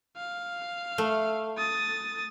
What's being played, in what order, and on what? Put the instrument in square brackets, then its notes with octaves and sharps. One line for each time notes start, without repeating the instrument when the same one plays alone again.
[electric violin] F5
[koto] A3
[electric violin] D#6 A6